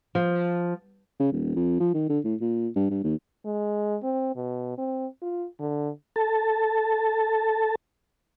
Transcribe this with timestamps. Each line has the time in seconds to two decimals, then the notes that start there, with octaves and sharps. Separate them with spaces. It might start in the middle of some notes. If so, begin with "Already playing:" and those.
0.15 F3
1.20 C#3
1.32 D#1
1.56 F2
1.80 F3
1.94 D#3
2.09 D3
2.24 A2
2.41 A#2
2.76 G2
2.90 G2
3.04 D#2
3.46 G#3
4.03 C4
4.36 B2
4.78 C4
5.22 F4
5.60 D3
6.16 A4 A5